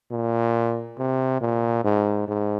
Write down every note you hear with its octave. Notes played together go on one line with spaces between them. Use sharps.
A#2
C3
A#2
G#2
G#2